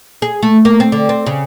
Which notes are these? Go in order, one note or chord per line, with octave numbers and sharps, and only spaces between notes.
G#4
A3
A#3
C4
D3
C4
C#3